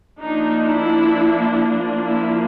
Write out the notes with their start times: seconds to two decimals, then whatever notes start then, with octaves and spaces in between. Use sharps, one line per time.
0.20 F3 A#3 D4 D#4
0.66 E4
2.05 E4